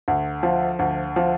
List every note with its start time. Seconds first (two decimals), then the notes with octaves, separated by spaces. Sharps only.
0.08 D2
0.43 F3
0.79 D2
1.16 F3